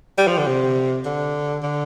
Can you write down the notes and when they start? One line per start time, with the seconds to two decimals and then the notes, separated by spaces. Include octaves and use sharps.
0.18 G3
0.27 F3
0.38 D3
0.47 C3
1.05 D3
1.63 D3